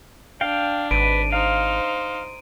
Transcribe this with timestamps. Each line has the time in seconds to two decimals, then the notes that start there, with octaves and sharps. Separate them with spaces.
0.41 D4 F5 G5
0.91 G#1 B4 D7 D#7
1.32 D#4 C5 F5